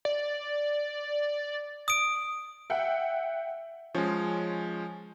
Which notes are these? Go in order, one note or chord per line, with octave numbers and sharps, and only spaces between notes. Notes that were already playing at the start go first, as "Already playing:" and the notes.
D5
D#6 D7
E5 F#5 G5
F3 G#3 C#4